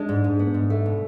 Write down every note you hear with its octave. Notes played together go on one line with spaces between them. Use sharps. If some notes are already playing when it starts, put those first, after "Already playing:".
Already playing: G#3 D4
G#2
G#2
B3
G#2
A3
B2